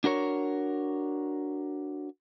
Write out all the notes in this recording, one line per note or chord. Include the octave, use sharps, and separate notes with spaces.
D4 F#4 A#4 C#5